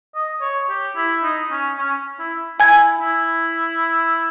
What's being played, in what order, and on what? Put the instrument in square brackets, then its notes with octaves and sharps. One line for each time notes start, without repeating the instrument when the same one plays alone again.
[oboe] D#5
C#5
G4
E4
D#4
C#4
C#4
E4
[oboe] E4 [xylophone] G#5 G#6
[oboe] E4